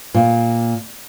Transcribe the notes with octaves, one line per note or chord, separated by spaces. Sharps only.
A#2